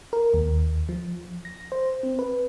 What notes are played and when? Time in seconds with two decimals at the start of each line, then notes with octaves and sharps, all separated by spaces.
0.13 A#4
0.34 D#2
0.89 F3
1.45 A#6
1.72 C5
2.03 C4
2.19 B4